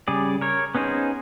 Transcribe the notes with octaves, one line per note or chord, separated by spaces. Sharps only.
C#3 G3 G#4 D5
A#4 C#5
B3 C#4 D#4 G#4 C5